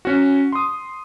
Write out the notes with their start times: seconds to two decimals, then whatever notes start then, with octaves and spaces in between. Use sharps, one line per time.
0.05 C#4 F#4
0.52 C6 D#6